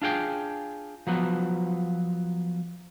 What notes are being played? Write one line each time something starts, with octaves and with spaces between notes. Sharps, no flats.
D4 F4 G#4 G5
F3 F#3 B3